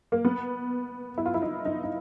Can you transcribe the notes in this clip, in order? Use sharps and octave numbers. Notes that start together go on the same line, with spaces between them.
A#3
B3
E4
F4
E4
D#4
D#4
D#4